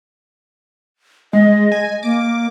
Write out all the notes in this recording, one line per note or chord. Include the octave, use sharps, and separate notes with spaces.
G#3 D#5
G#5
A#3 D6